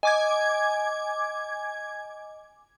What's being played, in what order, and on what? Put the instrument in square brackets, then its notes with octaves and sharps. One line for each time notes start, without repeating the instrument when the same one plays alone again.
[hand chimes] D#5 [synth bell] G#5 D6 G#6